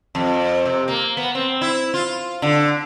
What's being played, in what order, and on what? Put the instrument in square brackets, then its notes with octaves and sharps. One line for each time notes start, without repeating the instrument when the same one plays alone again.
[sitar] F2
C3
A#3
B3
C4
E4
F4
D3